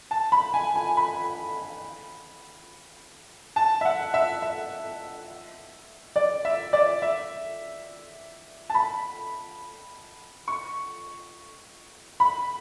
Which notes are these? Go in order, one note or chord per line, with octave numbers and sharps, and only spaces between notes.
A5
B5
G#5
G#5
B5
A5
E5
F#5
E5
E5
D5
E5
D5
E5
A5
B5
C#6
B5